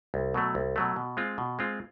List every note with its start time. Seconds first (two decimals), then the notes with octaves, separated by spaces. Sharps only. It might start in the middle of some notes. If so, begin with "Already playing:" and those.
0.14 C2
0.34 B2 F#3 A3
0.55 C2
0.76 B2 F#3 A3
0.96 B2
1.17 G#3 C4 F4
1.38 B2
1.59 G#3 C4 F4